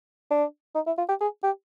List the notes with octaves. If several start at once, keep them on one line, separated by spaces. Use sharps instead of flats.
D4
D#4
E4
F4
G4
G#4
G4